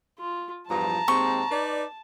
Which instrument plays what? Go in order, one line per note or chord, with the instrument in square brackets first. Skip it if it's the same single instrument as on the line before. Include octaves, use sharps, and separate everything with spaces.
[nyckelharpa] F4
[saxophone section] E2 G2 F3 [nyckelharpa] A5 [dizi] A#5
[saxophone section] D#2 G#3 C4 [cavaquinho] C#6
[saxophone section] D#4 B4 D5